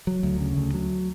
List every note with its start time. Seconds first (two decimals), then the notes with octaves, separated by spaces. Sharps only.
0.07 F#3
0.23 D2
0.41 C#3
0.57 D2
0.74 F#3